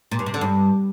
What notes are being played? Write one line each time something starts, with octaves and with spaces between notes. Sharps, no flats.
A#2
G2
C3
D3
G2